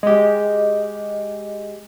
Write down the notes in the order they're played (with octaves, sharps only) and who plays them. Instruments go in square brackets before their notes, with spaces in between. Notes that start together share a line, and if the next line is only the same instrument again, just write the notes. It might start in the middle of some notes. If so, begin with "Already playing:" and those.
[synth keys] G#3 G4 [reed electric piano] D#5